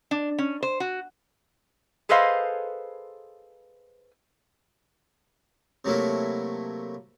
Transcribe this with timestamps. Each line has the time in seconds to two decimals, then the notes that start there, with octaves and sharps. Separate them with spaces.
0.11 D4
0.38 C#4
0.63 C5
0.80 F#4
2.09 G#4 A4 B4 C5 D#5 F5
5.85 C3 F#3 A3 A#3 E4